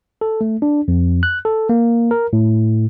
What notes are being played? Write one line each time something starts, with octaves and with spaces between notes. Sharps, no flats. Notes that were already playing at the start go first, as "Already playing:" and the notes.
A4
A3
D4
F2
F#6
A4
A#3
A#4
A2